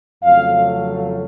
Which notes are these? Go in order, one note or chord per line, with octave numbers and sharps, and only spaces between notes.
F2 C#3 F#3 A3 F5